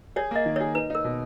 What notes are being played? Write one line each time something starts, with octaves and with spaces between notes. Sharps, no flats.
G#4 C#5
A#3 D#5
D#3
G#4 C#5
D#4 B4
D#4 A#4
B2